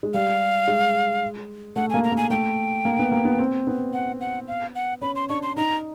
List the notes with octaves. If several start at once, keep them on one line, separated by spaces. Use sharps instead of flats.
G#3
G3 F5
G#3
A3 F#5
A#3 G#5
A#5
A#3
G#5
A3 G5
A#3
B3
A#3
B3
C4
B3
F#5
F#5
F5
F#5
C#4 B5
C6
D4 C#6
C6
D#4 A#5